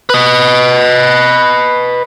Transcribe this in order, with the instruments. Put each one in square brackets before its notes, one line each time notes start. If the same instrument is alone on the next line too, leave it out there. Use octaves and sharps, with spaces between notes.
[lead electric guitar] B4 D#5